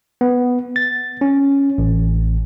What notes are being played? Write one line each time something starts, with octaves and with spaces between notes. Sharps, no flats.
B3
A6
C#4
A1